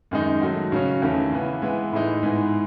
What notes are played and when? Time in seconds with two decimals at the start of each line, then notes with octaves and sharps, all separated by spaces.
0.11 F#2 D#3 G#3 D#4
0.41 D#3 F#3 A3
0.72 C#3 F#3 C#4
1.02 E2 D#3 A3 C#4
1.32 C#3 E3 B3
1.62 E3 G#3 B3
1.92 A2 E3 G#3 D#4
2.23 G#2 E3 G#3 B3